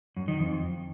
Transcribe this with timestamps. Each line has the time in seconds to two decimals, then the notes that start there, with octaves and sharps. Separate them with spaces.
0.17 F#2
0.28 D#3
0.39 F2